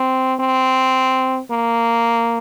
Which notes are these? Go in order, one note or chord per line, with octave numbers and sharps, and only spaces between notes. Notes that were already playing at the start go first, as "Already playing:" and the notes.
Already playing: C4
C4
A#3